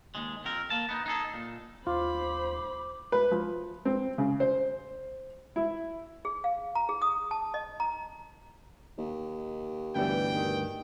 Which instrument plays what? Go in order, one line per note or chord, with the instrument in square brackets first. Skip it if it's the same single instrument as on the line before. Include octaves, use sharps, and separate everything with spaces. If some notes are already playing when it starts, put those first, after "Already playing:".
[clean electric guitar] D#2 G#3
F2 C4 A#4
A#3 A5
B3 D#4
D#4 G#4 A4
A#2
[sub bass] D#2 [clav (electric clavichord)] F4 [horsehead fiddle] C5 B5 [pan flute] D6
[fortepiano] B4
F3
C4
C#3
C5
E4
[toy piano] G#4
F5
A#5
G#4
D#6
A5
D#5
A#5
[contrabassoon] D#2
[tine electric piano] D2 G2 [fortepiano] E3 G3 B3 [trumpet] G5
[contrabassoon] D#3